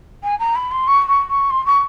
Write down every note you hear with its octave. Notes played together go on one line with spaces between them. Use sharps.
G#5
A#5
B5
C6
C#6
C#6
C#6
C6
C#6